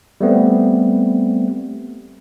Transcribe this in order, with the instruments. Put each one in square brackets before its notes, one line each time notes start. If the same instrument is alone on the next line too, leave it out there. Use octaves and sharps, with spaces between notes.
[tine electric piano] G3 A3 B3 C4